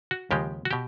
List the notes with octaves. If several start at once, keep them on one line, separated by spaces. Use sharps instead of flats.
F#4
D#2 C#3 F3 G#3 G4
F#4
B2 G4